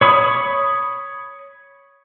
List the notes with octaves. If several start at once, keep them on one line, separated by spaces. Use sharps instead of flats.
C#5 B5 D#6